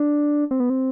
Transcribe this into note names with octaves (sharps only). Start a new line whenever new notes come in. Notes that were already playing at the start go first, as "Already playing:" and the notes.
Already playing: D4
C4
B3
C4